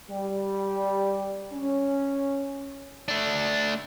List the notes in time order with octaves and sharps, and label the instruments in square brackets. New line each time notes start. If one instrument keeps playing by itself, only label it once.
[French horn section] G3
C#4
[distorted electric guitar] A3 D4